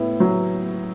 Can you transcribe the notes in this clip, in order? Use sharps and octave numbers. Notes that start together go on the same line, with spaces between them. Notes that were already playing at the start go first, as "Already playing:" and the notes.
Already playing: A2 B3 E4
F#3